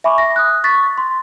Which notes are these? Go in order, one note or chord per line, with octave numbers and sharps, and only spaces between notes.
E5 G#5 B5 C#6 D6
A#6
D#6 F#6
C#6 A6 B6
C6